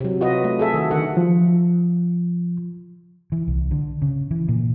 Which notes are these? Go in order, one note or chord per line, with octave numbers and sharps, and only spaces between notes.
C3 F#3
F4 F#4 B4 D#5
A3
G#4 A4 E5
D#3 F#4
D3 D#3 F#5
F3
E3
C2
D3
C#3
E3
A#2